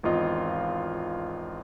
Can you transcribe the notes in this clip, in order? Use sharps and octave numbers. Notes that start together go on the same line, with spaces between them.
G#1 E2 F4 D#5 F5